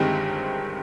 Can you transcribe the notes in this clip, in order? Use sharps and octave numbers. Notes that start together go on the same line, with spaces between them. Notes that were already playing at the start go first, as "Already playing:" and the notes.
Already playing: G1 G2 D#3 G#3 C4 G4 G5